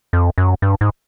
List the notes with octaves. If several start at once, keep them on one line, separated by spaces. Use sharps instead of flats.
F2
F#2
G2
G#2